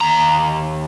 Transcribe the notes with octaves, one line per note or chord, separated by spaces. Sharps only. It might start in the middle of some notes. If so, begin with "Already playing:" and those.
D#2 A#5